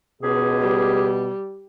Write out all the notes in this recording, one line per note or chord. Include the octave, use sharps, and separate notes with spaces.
C#2 B2 G4 G#4
G3